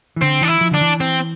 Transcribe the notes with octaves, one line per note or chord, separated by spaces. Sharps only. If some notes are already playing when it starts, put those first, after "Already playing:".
E3
D3 C4
E3 D4
E4
F3
D3 D4
E3
C4